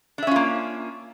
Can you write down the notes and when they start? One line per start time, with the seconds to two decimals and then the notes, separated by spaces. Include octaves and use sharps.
0.18 D4
0.23 E5
0.27 C#4
0.31 F4
0.36 A#3